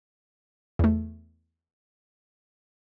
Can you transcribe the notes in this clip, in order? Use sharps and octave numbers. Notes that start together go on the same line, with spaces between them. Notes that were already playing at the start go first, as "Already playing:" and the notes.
E2 A3